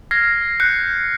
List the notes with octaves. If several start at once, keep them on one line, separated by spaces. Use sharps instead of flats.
F6 G#6 A#6 C7
F#6 G6 C7 C#7